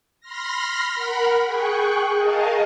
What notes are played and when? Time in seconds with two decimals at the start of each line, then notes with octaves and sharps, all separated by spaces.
0.21 B5 C6 F6 A#6
0.95 A#4 F#5 B5
1.46 G#4 G5 C#6 F#6
2.18 G#4 A#4 D#5 F5 G#5 A5